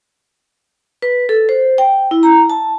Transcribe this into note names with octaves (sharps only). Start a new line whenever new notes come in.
B4
A4
C5
G5
E4
A#5
A5